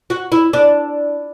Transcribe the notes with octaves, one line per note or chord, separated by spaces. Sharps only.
F#4
E4
D4